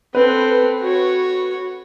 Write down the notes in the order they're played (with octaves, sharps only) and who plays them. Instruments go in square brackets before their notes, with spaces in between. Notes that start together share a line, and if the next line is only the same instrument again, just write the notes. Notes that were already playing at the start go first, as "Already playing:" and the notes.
[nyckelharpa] C4 A4 [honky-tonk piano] B4
[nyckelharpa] F#4 C#5